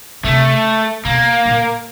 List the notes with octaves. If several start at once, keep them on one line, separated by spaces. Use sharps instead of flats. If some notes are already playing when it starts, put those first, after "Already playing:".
C3 A3
B2 A#3
A#2